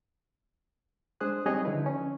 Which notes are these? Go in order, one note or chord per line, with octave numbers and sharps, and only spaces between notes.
G#3 D4 G#4 C5 D#6 F#6
G3 C4 D#4 G#4 C#5 D#5
D3 F3 C#4 D#4 E4 B4
C#4